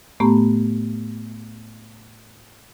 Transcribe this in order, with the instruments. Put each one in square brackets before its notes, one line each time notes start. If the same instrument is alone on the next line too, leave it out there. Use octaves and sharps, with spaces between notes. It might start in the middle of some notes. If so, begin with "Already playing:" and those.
[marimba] A2 A3 B3 G4 A#5